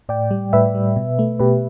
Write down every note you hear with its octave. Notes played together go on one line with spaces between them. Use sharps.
A2 D5 G5
G3
A2 B4 E5
G3
B2
A3
B2 G4 B4